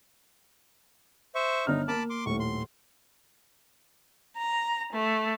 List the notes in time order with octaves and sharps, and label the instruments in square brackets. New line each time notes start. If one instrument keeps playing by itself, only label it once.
[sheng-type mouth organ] C5 E5 C#6
[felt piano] G1 D3 F6 [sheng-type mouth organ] D#4
[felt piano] A#3 [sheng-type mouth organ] A5 B5 D6
[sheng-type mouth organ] C6 D6
[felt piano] D#1 A2 [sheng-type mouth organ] C#6
[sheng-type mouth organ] C6
[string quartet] A#5
A3